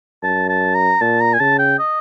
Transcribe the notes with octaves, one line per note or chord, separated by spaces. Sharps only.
F#2 A5
A5
A#5
A#2 A5
A#5
G#5
C#3 A5
G5
D#5